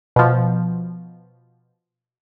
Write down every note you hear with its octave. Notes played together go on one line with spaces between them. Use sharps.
B2 F3